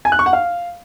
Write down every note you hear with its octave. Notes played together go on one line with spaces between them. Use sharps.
G#5
F#6
C#6
F#5
F5